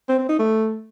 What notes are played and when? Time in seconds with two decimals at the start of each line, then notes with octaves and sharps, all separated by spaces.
0.09 C4
0.19 C4
0.29 D#4
0.39 A3